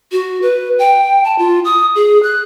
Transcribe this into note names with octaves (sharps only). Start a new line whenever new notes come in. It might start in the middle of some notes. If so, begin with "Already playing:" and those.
F#4
B4
G5
A5
F4
D#6
G#4
F#6